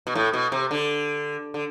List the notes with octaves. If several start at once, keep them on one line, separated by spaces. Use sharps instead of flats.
B2
A2
B2
C3
D3
D3